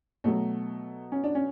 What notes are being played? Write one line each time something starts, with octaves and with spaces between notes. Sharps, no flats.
B2 F#3 A3
C#4
D4
C#4